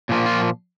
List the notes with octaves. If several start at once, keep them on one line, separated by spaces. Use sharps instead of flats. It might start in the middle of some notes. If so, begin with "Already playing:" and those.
A#2 F3 A#3
F4